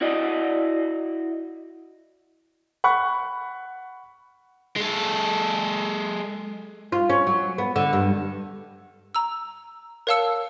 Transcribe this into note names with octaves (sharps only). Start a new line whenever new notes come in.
E4 F#4 D5 D#5
F#5 B5 C#6 F#6
G#3 A4
F4
C#4
F#3
B3
D3
G2
A#5 E6
A#4 C#5 F5 A5 E6 C#7